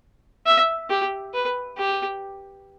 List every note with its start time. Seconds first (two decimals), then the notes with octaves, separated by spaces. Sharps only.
0.46 E5
0.90 G4
1.33 B4
1.77 G4